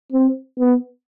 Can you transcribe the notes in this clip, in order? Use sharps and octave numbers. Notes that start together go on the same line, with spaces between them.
C4
B3